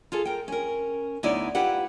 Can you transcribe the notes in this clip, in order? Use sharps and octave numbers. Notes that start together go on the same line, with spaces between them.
F4 G#4 A4
A#4 G5
C#4 A#4
D2 B3 D#4 E4 C#5 D5
E4 F4 G4 B4 F#5